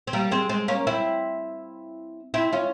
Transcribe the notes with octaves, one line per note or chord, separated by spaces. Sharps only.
C4
G3 A#3
G#3 C4
G#3 C4
A#3 C#4
C4 E4
C4 E4
C#4 F4